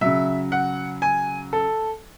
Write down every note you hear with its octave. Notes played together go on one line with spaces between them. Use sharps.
C#3 F#3 E5
F#5
G#5
A4